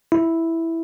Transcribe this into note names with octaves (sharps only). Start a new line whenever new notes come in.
E4